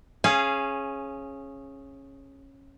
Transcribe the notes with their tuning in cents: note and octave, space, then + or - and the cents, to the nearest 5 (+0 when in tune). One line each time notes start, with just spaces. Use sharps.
C#4 -15 G#4 +5 F5 -20